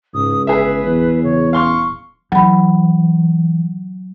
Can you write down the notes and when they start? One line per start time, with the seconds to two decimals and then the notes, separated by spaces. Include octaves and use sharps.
0.14 C#2 G#2 D#6
0.47 G1 G#4 B4 E5
0.85 E2
1.24 C#3 C#5
1.53 D#1 F5 C6 C#6 F6
2.32 E3 F#3 B5